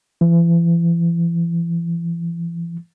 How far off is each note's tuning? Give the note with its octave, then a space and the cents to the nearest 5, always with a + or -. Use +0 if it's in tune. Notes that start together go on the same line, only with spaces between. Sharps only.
E3 +40